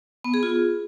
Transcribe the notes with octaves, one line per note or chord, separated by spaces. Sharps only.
B3
G#4
F4